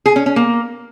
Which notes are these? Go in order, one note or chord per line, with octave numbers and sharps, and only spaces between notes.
G#4
C#4
C#4
A#3